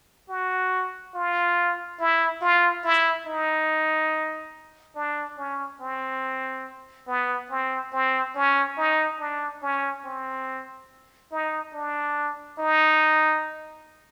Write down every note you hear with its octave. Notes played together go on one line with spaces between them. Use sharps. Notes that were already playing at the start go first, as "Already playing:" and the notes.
F#4
F4
E4
F4
E4
D#4
D4
C#4
C4
B3
C4
C4
C#4
D#4
D4
C#4
C4
D#4
D4
D#4